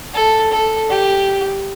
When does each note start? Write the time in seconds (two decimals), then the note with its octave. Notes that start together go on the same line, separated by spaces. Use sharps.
0.14 A4
0.51 A4
0.90 G4